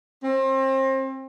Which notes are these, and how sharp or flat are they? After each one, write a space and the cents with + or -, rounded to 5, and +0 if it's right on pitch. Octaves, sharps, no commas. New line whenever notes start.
C4 +30